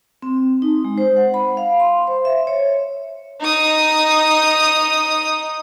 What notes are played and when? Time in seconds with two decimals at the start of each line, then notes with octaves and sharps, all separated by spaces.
0.22 C4
0.62 D#4
0.85 G#3
0.98 C5
1.17 F#5
1.34 B5
1.57 F5
1.80 C6
2.07 C5
2.25 E5
2.47 C#5
3.41 D#4 D#6